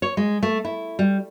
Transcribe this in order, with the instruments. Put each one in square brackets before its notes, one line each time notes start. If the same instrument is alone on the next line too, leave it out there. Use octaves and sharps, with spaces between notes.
[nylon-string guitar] C#5
G#3
A3
E4
G3